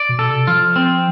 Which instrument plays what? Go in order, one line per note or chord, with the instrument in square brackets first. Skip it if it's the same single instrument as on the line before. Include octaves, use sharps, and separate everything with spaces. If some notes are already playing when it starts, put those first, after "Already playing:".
Already playing: [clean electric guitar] D5
[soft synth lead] B2
[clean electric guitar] A4
[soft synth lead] C3
[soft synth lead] F3 [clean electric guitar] F4
[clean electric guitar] C4